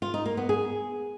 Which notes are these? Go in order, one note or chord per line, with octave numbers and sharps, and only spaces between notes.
F4
D#4
A#3
B3
G#4